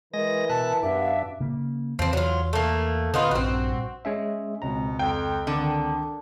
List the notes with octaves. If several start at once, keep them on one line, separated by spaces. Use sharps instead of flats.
E3 G#3 A#4 D#5 A#6
B2 E5 A5 F#6
F#2 B3 D4 G4 E5 F5
C#3 A#3
E2 E3 F3 C4
F#3 F4
A3 A#3
D3 B3 C#4 D#4 F4
A#1 G2 C4 F#4
G#3 C#4 E5
C#2 B2 C4 A#5
F2 G5
D3 D#3